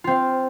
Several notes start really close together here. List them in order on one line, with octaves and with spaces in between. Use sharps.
F4 C4 F5